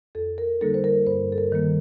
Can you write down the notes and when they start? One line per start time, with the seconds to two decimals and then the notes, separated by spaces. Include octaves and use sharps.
0.15 F2 A4
0.38 A#4
0.61 D3 G3 A#3 D#4 A4
0.74 C5
0.84 A#4
1.06 G2 C5
1.32 A4
1.38 A#4
1.52 D#3 G3 A#3